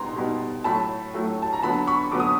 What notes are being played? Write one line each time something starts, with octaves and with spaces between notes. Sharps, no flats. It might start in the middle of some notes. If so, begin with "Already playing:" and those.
Already playing: B2 G3 B3 D#4 A#5 C6
B2 G3 B3 D#4
A2 F#3 A3 A5 B5
A2 F#3 A3
A5
A#5
D3 F#3 B3 A5 B5
B5 C#6
D3 F#3 B3 D6
D#6